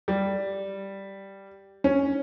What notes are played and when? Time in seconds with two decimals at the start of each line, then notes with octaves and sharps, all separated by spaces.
0.08 G3
1.84 C#4